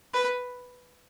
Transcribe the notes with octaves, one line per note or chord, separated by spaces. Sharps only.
B4